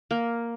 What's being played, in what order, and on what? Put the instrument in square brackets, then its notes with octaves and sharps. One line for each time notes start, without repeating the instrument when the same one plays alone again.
[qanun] A#3